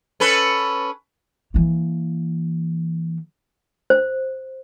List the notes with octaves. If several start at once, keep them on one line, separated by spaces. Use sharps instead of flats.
C#4 A4 B4
E3 A#3
C5